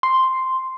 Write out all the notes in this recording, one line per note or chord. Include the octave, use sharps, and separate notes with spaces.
C6